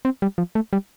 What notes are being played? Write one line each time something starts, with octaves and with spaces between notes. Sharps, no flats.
C4
G3
F3
A3
G3